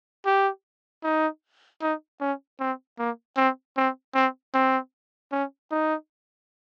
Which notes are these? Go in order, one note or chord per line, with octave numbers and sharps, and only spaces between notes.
G4
D#4
D#4
C#4
C4
A#3
C4
C4
C4
C4
C#4
D#4